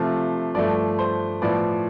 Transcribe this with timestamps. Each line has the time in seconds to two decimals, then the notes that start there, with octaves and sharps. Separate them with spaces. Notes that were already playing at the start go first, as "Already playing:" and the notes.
Already playing: C3 F3 A3 F5
0.54 G2 F3 A3 D5
0.99 C5
1.42 A2 F3 B3 D5